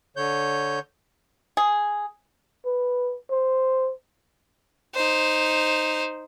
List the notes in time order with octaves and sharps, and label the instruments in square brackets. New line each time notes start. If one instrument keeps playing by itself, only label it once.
[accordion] D3 C#5 G6
[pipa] G#4
[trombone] B4
C5
[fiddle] D#4 C5